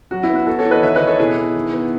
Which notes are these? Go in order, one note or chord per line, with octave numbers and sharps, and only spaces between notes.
F#3 F#4
E4
B3
F#4
B3 F#4 A4
A4 C#5
E3
B4 D#5
D#3 C#5 E5
B4 D#5
D#3
A4 C#5
B2 E4 G#4
B3
D#3
B3